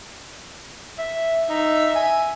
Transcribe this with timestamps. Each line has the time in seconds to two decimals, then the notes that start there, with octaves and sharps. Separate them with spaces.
0.98 E5
1.49 D#4 E5
1.95 G#5